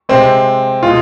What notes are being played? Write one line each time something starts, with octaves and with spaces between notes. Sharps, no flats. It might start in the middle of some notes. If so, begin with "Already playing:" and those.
C3 G#3 C4
B2 G#3 F4